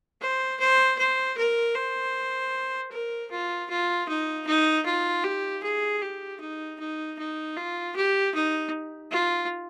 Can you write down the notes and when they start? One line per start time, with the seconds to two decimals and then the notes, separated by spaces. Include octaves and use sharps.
0.21 C5
0.60 C5
0.99 C5
1.38 A#4
1.75 C5
2.91 A#4
3.31 F4
3.70 F4
4.09 D#4
4.47 D#4
4.86 F4
5.24 G4
5.63 G#4
6.02 G4
6.40 D#4
6.79 D#4
7.18 D#4
7.57 F4
7.96 G4
8.35 D#4
9.11 F4